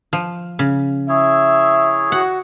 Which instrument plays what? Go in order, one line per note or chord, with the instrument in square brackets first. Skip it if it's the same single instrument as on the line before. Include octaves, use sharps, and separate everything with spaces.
[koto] F3
C#3
[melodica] E4 G#4 C#5 [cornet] E5
[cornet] F#4 [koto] F#5